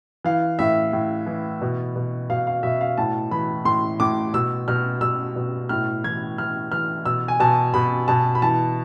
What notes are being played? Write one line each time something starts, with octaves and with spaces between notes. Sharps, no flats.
E3 F5
A2 E5
A2
E3
B2
B2
B2 F5
F5
B2 E5
F5
A2 A5
E3 B5
A2 C6
A2 D6
B2 E6
B2 F6
B2 E6
B2
A2 F6
E3 G#6
E3 F6
E3 F6
B2 E6
G#5
B2 A5
B2 B5
B2 A5
B5
E3 A5